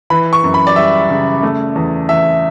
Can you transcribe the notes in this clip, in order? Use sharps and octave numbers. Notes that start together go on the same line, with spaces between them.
E3 B5
C#6
F#2
B5
D5
G3 E5
C#3
A3
E2
E2 E5